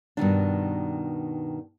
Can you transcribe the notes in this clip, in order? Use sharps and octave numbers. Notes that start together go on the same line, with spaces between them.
G2 B2 D#3 D4